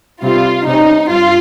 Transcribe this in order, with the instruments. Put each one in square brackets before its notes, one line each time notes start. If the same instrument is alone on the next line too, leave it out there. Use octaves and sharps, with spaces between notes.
[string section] C3 G3 C4 F4
C3 G3 C#4 D#4
G2 F4